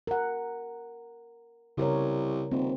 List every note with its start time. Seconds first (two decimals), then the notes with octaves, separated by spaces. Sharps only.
0.07 A#4 F#5
1.77 C2 C#3 A#4 C#5
2.52 D#1 C4